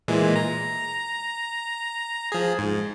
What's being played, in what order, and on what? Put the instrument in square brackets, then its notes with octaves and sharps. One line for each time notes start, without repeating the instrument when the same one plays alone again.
[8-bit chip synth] A#2 E3 G#3
A#5
F3 G#4
G#2